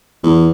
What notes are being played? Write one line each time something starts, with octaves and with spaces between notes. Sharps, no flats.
E2